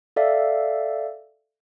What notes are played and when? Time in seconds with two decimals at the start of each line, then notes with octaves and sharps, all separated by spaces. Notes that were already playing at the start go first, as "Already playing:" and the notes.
0.16 A4 D5 E5 F5